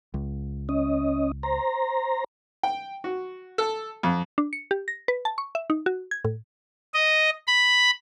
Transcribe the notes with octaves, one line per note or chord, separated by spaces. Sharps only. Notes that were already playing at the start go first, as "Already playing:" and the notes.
C#2
C#4 D#5
C5 A#5
G5
F#4
A4
F2
D4
C#7
G4
A#6
B4
A5
C#6
E5
D#4
F#4
G#6
A2
D#5
B5